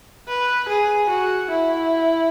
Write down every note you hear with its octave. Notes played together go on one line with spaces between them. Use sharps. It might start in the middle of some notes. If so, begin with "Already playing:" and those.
B4
G#4
F#4
E4